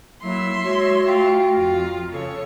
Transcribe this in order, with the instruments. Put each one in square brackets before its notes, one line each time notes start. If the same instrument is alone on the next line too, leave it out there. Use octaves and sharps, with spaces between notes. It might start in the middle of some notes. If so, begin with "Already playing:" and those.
[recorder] F#3 [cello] A#3 [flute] E4 [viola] E5 C6
[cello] G#3 [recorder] F#4 [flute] C#5
[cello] A3 F4 [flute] G5
[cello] F2 [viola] F4
[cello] C#3 [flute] A4 [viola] C#5